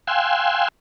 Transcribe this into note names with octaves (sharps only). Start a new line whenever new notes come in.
F5 G5 G#5 C6 E6 F#6